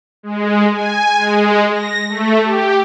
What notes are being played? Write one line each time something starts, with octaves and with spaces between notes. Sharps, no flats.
G#3
G#5
G#3
A#6
A3
G4